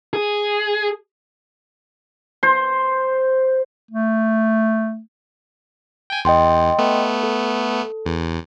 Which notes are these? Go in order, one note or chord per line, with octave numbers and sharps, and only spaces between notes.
G#4
C5
A3
G5 G#5
E2 D#5 G5 C6
A3 B3
A4
E2